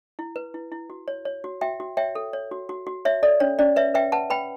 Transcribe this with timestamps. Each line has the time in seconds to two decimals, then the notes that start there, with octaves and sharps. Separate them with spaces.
0.19 E4
0.36 B4
0.54 E4
0.72 E4
0.90 F#4
1.08 C#5
1.25 C#5
1.44 F#4
1.61 F#4 E5 G5
1.80 F#4
1.97 C#5 E5 G5
2.15 A4
2.33 C#5
2.51 F#4
2.69 F#4
2.87 F#4
3.05 C#5 E5
3.23 A4 D5
3.40 C#4 C#5
3.59 C#4 D5
3.76 B4 C#5 E5
3.94 B4 E5 G5
4.12 B4 F#5 A5
4.30 B4 G5 B5